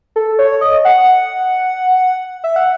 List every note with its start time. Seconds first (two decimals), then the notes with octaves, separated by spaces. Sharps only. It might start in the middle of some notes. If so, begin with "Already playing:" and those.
0.16 A4
0.39 C#5
0.61 D#5
0.85 F#5
2.44 E5
2.56 F#5